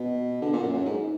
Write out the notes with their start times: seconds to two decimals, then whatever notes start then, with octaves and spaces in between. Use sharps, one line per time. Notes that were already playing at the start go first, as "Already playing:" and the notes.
Already playing: B2
0.42 D3
0.53 A#2
0.63 F#2
0.74 F#2
0.85 G#2